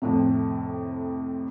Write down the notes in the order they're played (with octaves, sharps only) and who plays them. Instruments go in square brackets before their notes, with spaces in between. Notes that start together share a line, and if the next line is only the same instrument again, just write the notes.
[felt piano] F2 A2 C3